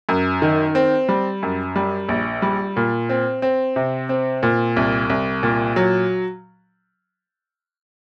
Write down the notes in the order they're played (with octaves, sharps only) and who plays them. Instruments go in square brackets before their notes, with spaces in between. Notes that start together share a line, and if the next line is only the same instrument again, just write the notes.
[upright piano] F#2
D#3
C4
G3
F#2
G3
A#1
G3
A#2
C4
C4
C3
C4
A#2
C2
C2
A#2
F#3